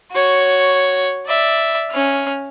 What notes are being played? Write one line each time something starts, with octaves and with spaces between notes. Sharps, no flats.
F#4 C#5
D5 E5
C#4 F6